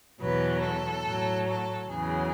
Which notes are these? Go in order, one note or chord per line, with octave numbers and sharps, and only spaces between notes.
E2 B2 F#3 B4
A4
A2 F#3
A4
E2 C#3 F#3 G#4